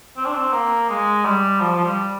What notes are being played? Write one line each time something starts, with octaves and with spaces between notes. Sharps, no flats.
C4
D4
C4
A#3
G#3
G3
F3
F3
G3